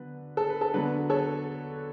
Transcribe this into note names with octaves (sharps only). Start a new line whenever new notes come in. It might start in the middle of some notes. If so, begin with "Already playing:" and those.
Already playing: D3 F#3 B3 B4
A4
B4
A4
D3 F#3 B3 B4
A4 C#5